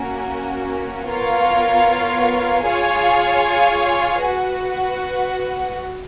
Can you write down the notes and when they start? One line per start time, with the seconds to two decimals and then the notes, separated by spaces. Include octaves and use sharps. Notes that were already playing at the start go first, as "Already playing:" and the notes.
Already playing: A#3 C#4 F#4 A#4
1.10 B3 F4 A#4 C#5 F5
2.67 F4 G#4 C#5 F5 G#5
4.25 F#4 B4 F#5